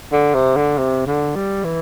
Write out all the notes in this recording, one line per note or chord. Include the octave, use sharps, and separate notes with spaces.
D3
C3
D3
C3
D3
G3
E3